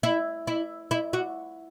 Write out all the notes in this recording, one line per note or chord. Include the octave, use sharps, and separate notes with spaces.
E4
E4
E4
F#4